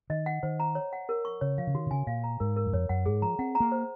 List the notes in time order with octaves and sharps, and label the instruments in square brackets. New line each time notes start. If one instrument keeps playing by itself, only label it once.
[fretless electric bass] D#3 [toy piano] D#5
[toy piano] F#5
[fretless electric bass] D#3 [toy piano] C5
[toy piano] A#5
C#5
F#5
A#4
C#6
[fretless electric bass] C#3 [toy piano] C#5
[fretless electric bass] F3 [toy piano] F5
[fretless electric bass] C#3
[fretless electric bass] D#3 [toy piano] F#4
[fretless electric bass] C3
[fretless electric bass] C#3 [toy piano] G#5
[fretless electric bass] A#2 [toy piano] F5
[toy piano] A#5
[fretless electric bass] G#2 [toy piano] A#4
[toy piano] A#4
[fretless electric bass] F#2
[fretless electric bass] F2 [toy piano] C#5
[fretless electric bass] F#2 [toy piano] F#5
[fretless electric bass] G#2 [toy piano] G#4
[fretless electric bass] F3 [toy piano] A#5
[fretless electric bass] C4 [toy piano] F#5
[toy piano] A#5
[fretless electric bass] A#3
[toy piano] C5